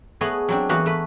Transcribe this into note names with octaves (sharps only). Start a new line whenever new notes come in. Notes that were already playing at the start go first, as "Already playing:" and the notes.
A3 B3 G#4 C#5 D#5 F#5
F#3 C4 D4
E3 A#3 B3 F#4
A3 B4